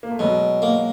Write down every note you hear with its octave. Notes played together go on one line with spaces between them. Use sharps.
A#3
A3
B2 F#3 G#3
A#3